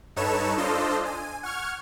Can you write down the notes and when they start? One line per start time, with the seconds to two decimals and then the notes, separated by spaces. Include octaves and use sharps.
0.16 G2 D#4 A4 B4 C#5 E7
0.57 D4 F4 A4 C5 D#5
1.05 G#5
1.43 F#5 C#6 F6 G#6